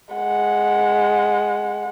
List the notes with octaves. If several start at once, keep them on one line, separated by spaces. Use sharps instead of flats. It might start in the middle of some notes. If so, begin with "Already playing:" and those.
G#3 F#5